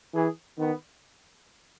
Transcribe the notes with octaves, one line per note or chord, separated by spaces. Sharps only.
E3 G#4
D#3 B3